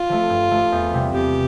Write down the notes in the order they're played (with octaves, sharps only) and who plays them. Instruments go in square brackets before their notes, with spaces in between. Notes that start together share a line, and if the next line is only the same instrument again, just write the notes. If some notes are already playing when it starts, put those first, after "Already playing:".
Already playing: [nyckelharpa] F4
[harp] F3 A3
G2
F3 A3
E2
C3 G3
[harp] E2 [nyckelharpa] G4